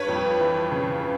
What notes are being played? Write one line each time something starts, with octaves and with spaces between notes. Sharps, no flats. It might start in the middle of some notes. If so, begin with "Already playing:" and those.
Already playing: G2 B4 C#5
F2
E3
C#3